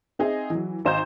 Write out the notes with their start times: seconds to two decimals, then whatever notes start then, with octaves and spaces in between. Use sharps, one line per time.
0.19 C4 D#4 G#4 D#5 E5
0.50 E3 F#3
0.85 G#1 D#4 C5 F5 A#5 G6